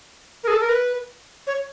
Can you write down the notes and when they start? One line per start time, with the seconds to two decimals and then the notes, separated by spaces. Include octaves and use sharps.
0.44 A#4
0.48 G#4
0.52 A4
0.61 A#4
0.69 B4
1.47 C#5